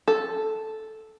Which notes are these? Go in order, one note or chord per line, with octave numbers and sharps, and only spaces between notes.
A4